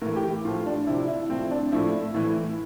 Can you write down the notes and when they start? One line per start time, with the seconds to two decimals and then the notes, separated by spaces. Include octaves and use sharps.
0.02 A2 E3 A#4
0.16 G4
0.45 A2 F3 F4
0.67 D4
0.87 C3 F3 E4
1.08 E4
1.29 A2 F3 C4
1.51 D4
1.72 A2 F3 E4
2.14 A2 E3